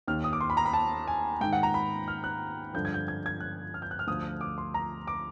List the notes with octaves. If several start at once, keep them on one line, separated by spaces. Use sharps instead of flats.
D#2 D#3 F6
D#6
D6
C6
B5
A#5
B5
A5
G#5
G#2 D#3 G5
F#5
A#5
B5
F6
F#6
G2 D3 F3 G6
G#6
G6
G#6
G#6
F#6
F6
G6
F#6
F6
D2 D3 F3 D#6
D6
C6
A#5
D6